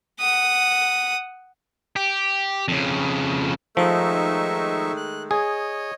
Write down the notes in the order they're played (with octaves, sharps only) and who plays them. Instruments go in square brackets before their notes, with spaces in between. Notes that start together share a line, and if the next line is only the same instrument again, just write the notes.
[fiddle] F#5 D#6
[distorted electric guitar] G4
F2 C#3
[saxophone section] D#3 G#3 A3 [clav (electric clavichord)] F3 [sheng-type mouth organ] D#4 E5 C#6
[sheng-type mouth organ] F#6
[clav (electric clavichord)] G#4 [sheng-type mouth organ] C#5 D#5